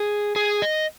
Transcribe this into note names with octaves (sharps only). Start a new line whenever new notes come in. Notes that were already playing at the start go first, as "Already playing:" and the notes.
Already playing: G#4
G#4
D#5